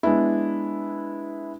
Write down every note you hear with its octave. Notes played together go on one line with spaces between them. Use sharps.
G#3 B3 D4 E4